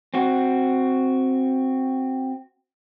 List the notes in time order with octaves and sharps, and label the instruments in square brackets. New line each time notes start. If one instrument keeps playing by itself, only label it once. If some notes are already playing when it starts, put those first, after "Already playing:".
[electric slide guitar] C4 F#4